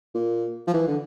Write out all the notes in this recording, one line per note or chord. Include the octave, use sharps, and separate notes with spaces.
A#2
F3
E3
D3